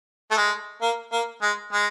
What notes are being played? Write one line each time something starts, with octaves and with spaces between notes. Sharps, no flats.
A3
G#3
A#3
A#3
G#3
G#3